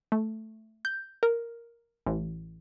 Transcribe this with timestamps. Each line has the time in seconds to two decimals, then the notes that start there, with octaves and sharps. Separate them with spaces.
0.12 A3
0.85 G6
1.23 A#4
2.07 A1